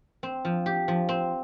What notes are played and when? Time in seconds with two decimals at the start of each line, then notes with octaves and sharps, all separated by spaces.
0.23 C4
0.45 F3
0.66 G4
0.88 F3
1.09 C4